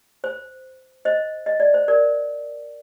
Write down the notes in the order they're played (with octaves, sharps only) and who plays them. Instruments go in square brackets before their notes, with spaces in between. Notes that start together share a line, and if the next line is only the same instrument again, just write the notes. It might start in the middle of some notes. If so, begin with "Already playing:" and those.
[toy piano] C5
C5 D#5
D#5
D5
C5
A#4 D5